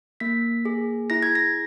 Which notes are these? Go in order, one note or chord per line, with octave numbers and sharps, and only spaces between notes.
A#3 B6
G#4
E4 A#6
G#6
A#6